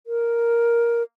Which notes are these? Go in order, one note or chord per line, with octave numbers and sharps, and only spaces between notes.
A#4